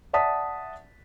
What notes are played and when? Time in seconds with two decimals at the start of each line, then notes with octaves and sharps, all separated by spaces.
0.13 D5 E5 F#5 A5 D#6 B6